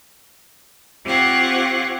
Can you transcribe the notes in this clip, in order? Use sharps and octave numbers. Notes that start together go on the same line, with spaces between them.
C4 F4 G4 C#5 F#5 G5